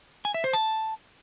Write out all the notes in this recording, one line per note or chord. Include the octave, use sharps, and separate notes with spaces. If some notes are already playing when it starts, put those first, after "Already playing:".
G#5
E5
C5
A5